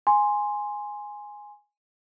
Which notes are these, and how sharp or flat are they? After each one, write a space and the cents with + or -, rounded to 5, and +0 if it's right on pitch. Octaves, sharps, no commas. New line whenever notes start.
G#5 +0 C6 +0